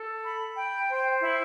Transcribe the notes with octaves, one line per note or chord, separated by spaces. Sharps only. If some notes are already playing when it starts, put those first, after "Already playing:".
Already playing: A4
B5
G5
C5
E4